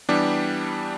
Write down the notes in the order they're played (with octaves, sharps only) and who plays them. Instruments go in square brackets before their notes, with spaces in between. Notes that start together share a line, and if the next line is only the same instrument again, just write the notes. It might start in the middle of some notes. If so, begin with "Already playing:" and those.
[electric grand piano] E3 G3 B3 D4 G4